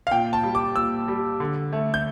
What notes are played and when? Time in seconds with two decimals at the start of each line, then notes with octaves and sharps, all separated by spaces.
0.07 F5
0.11 A#2 G5
0.33 A5
0.43 G3
0.55 D6
0.76 A#2 E6
1.08 G3
1.40 D3
1.73 A3
1.94 G6